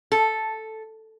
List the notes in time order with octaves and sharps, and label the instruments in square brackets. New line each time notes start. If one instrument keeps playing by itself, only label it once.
[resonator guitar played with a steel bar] A4